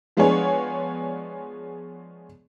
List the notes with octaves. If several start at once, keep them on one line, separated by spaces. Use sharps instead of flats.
F3 G#3 B3 D4 G#4 C#5